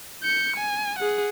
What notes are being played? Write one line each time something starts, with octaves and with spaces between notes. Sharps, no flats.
G6 C#7
G#5
G#4 F#5